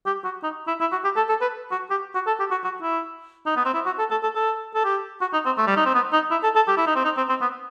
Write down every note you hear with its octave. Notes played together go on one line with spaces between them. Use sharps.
G4
F#4
D#4
E4
E4
F#4
G4
A4
A4
B4
F#4
G4
F#4
A4
G4
F#4
F#4
E4
D#4
B3
C4
E4
F#4
A4
A4
A4
A4
A4
G4
F#4
D#4
C4
A3
G3
D#4
C4
B3
D#4
E4
A4
A4
G4
E4
D#4
C4
D#4
C4
C4
B3